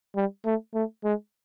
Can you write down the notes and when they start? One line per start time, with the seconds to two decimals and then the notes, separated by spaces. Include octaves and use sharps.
0.16 G3
0.46 A3
0.74 A3
1.04 G#3